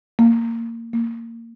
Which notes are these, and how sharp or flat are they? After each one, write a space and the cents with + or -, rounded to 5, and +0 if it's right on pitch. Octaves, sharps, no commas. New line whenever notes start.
A#3 -20
A#3 -20